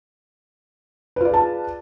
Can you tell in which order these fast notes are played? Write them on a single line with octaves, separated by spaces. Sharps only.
B4 F4 D5 G#4 A5